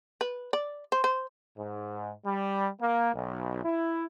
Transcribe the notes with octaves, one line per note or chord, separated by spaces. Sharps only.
B4
D5
C5
C5
G#2
G3
A#3
B1
E4